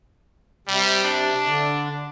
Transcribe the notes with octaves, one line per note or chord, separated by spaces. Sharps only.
C3 G3
D4
D3